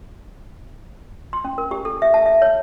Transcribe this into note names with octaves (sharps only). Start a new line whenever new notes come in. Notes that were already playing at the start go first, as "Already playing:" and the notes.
C6
C#4
A#4
G4
A4
E5
A5
E5
C#5